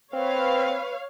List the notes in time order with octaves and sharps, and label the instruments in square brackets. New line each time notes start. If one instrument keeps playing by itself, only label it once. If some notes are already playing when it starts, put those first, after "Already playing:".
[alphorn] C4 [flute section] B4 [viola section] C#5 F5